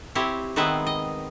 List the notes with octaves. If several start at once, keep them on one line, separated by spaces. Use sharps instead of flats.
C4 E4 G4 C#5
D#3 G#3 B3 C4 B4 E5
D#5